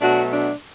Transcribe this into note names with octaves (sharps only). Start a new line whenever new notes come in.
B2 F#3 A3 D4 F#4
D4